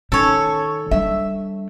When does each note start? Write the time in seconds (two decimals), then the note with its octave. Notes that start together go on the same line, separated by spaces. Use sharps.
0.12 D#3 C#4 A4 C#5
0.91 G3 D4 E5